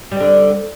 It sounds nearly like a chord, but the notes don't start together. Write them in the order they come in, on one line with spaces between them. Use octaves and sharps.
G3 C4 D3